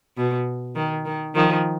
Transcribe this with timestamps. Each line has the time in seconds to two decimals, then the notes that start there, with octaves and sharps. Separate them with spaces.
0.17 B2
0.75 D#3
1.05 D#3
1.35 D#3 F3